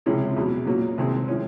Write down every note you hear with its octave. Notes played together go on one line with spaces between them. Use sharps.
C#2 C3 F3 G#3 C#4
E2 B2 F#3
A#2 F#3 A#3 C#4
C2 C3 D#3 G#3 C4
F3 G#3 C#4